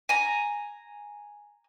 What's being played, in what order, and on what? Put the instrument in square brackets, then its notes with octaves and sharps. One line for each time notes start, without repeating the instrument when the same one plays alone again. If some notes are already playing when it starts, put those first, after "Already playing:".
[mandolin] G#5 A#5